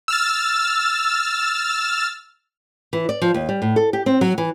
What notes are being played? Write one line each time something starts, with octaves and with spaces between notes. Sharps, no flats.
E6 F6 A6
E3
D5
F3
D#2
G3
A2
A4
G4
C4
F#3
E3